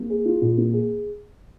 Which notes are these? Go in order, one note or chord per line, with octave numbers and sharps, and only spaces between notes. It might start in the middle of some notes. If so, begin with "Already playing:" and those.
Already playing: A#3
G#4
F4
A#2
A#3
G#4